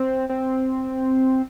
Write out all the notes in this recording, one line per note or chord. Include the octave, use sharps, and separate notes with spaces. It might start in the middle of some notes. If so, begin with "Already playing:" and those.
Already playing: C4
C4